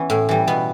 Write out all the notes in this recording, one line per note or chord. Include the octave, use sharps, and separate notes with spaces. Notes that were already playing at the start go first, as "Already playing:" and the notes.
Already playing: E3 B3 C#4
A2
E3 G3
B2 B3